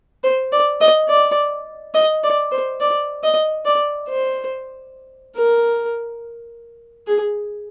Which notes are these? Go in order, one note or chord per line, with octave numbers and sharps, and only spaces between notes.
C5
D5
D#5
D5
D#5
D5
C5
D5
D#5
D5
C5
A#4
G#4